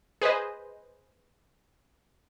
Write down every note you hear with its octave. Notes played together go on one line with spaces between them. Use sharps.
G#4 B4 C5 D#5